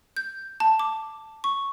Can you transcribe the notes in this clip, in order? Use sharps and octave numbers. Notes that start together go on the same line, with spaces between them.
G6
A5
D6
C#6